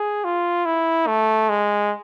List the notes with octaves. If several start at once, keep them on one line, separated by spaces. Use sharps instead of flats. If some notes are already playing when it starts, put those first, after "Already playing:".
Already playing: G#4
F4
E4
A3
G#3